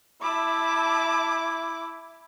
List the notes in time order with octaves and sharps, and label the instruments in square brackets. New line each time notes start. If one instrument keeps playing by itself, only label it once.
[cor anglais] E4 [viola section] E5 A5 B5 [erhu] D6